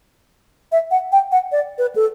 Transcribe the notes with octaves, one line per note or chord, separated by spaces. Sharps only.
E5
F#5
G5
F#5
D5
B4
A4